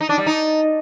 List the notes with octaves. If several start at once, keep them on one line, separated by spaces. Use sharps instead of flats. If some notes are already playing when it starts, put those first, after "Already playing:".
D#4
D4
G3
D#4